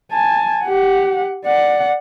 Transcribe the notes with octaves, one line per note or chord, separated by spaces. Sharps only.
G#5 A5
G4 F#5
D5 F#5